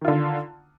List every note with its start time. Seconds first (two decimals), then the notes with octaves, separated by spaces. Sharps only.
0.01 D#3
0.05 F4
0.08 D3